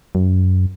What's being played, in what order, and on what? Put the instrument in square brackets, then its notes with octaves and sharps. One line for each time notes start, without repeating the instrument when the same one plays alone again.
[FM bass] F#2